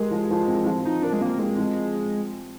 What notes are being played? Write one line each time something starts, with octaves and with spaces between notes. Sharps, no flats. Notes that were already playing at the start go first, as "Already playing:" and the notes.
Already playing: G#3 G4 A#4
F3
F3
C4
F3
F3 D#4
D4 A#4
G#3
A#3 C4
G#3 C4
F3